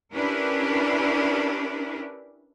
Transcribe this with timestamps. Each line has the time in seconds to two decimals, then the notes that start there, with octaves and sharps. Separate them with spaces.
0.13 C#4 D4 E4 G4 A#4 B4